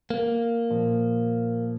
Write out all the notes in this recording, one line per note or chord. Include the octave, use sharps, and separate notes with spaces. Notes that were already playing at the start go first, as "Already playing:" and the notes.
A#3
A#2 F3